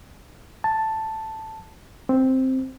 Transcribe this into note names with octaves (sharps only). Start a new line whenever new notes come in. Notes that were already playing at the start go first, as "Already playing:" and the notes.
A5
C4